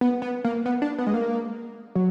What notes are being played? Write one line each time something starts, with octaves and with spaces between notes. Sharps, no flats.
B3
B3
A#3
B3
D4
B3
G#3
A#3
F#3